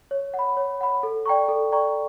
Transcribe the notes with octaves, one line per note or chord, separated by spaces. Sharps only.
C#5
F#5
B5
C#5
F#5 B5
A4
D5 G5 A#5 C#6
A4
D5 G5 A#5 C#6